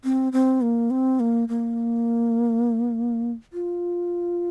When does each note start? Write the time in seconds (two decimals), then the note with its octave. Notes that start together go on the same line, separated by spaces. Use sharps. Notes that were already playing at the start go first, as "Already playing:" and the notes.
0.04 C4
0.33 C4
0.61 A#3
0.91 C4
1.20 A#3
1.49 A#3
3.53 F4